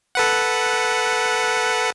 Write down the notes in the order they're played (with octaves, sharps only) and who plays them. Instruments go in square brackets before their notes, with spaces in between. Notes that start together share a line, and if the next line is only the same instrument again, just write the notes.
[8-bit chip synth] A4 B4 F#5